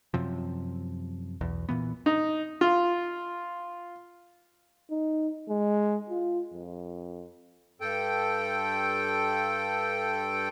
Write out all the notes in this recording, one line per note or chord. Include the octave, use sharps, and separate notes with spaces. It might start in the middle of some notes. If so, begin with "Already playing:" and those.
F#2 C3 F3
B1 E2
A#2 E3 B3
D#4
F4
D#4
G#3
F4
F2
G2 A4 G5